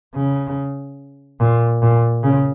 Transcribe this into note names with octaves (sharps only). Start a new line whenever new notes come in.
C#3
A#2
A#2
C#3